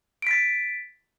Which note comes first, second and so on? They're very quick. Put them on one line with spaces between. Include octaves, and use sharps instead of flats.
D7 B6 A6